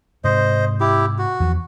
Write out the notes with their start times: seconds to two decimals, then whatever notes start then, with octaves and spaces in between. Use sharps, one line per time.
0.24 G#2 C3 C5 D#5
0.80 E4 G4
1.19 F#4
1.40 E2 E3 F3